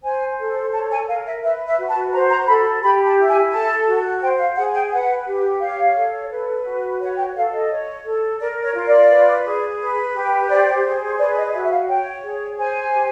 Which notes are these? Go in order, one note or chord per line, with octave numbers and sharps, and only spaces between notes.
C5 G#5
A4
C#5 A5
G#5
A#4 F5
E5
B4 E5
E5
F#4
A5
C5 A#5
A#5
A4 B5
G4 B5
A5
E4
G#5
A4 A5
F#4
C5 G5
F5
G#4 F#5
G5
B4 F#5
G4
C#5 F5
A4
B4
F#4
C#5 F#5
G5
A4 F5
D#5
C#5
A4
A#4 D5
C#5
F4
D5
B4
G#4
B4
G4
C5 D5
G#4
B4 D5
D#5
F#4 E5
E5
F5
C#5 G5
G#4
C5 G#5
G4